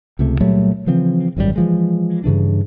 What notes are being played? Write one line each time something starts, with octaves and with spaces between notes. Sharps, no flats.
C#2 C3 A3
A#2 F#3 G3 A3
C#3 E3 F3 C4
G#1 F#2 A2 G3
E3 F3 G#3
G2 C#3 E3 D4